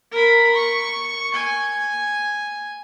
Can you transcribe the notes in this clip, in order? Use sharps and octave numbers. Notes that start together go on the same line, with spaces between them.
A#4 B5
C#6
G#5